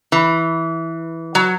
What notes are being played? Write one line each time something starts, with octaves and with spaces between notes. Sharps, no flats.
E3
F#3